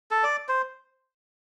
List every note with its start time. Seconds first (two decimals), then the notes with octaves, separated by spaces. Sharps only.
0.11 A4
0.23 D5
0.49 C5